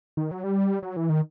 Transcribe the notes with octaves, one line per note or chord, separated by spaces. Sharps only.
D#3
F#3
G3
F#3
E3
D#3